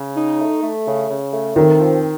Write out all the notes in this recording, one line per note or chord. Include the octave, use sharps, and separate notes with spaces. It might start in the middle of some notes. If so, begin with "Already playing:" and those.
Already playing: C#3
D#4
A3
A3
C#3
C#3
A3
D#3 C4
F3